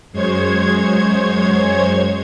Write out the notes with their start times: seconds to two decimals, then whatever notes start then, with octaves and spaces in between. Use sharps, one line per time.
0.12 F#2 G#3 C5 C#5 G#6